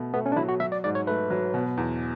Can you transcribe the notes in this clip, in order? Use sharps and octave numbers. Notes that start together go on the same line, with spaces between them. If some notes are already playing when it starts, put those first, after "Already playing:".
Already playing: B2 A3
A3 B3
C#4
D4
F#3 E4
F#4
F#3 E5
D5
G#2 D5
C#5
A3 B4
F#3
B2
E2